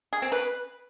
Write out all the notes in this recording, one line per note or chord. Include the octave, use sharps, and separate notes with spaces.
G#4
C4
B4